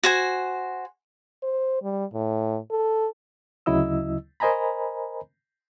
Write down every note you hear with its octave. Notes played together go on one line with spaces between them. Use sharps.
F#4 C5 G#5
C5
G3
A2
A4
D2 C#3 F#3 E4 D#5 E6
A#4 C5 D#5 G#5 A#5 B5